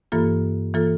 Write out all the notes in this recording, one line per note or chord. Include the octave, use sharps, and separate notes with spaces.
G2 E3 A#3 F4 A4
E3 A#3 F4 A4